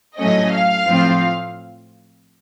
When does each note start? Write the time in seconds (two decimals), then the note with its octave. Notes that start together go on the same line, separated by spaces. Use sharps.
0.20 A2 F#3 A3 C#4 D#5
0.54 F5
0.88 A2 F3 C4 F4